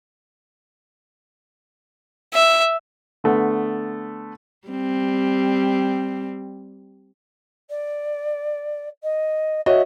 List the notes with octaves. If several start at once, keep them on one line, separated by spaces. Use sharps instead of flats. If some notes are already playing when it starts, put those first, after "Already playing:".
E5
D3 A3 B3
G3 C4
D5
D#5
F#4 C#5 D#5 E5